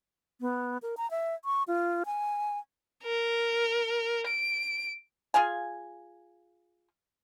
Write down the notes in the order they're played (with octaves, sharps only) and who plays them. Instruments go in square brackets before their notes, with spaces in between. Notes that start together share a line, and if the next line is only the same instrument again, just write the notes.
[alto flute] B3
A#4
A#5
E5
C#6
F4
G#5
[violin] A#4
D7
[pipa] F4 G#4 F5 G#5